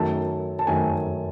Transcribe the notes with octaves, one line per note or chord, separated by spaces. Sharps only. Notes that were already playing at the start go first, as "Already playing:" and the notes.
Already playing: F#2 D#3 A3 A5
A5
F#2 D#3 A3 G#5